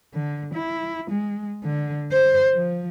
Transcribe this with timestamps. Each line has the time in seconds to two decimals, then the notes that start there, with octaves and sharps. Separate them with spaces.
0.14 D3
0.54 E4
1.11 G#3
1.63 D3
2.12 C5
2.53 F3